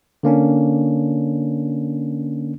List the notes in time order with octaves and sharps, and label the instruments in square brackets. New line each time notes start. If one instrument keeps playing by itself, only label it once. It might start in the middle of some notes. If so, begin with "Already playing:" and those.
[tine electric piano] D3 A#3 C#4 D4